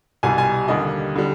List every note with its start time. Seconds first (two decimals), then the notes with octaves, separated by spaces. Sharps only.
0.23 C2 B2 G3 G#5
0.38 G#5
0.68 D#2 D3 G3 D#5
1.16 D3 G3